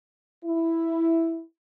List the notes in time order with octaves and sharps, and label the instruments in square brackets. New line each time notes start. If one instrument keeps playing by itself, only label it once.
[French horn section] E4